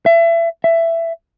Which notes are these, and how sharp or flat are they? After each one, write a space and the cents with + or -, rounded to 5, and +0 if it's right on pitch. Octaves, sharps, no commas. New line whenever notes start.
E5 +30
E5 +15